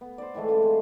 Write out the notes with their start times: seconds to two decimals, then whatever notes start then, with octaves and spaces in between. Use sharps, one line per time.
0.01 B3
0.18 C5 D5
0.34 A2 E3 G#3 A3
0.48 C#3 F4
0.62 E3 C4